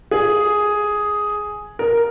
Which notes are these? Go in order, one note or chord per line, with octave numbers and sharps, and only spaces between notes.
G#4
A#4